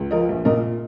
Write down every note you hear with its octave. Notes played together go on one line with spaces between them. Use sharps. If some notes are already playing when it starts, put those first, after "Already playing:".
Already playing: C#2
F3 A#4 D#5
A#1
A#2 A#4 D#5